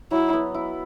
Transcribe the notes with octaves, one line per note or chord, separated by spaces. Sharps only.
F#3 E4
B3
E4